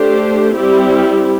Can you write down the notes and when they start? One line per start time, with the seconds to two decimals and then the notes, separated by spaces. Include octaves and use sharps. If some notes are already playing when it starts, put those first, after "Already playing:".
Already playing: A3 D4 G4 C5
0.55 G3 C4 E4 G4